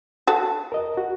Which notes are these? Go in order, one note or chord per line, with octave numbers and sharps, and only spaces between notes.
F#4 A4
A#4 D#5
F#4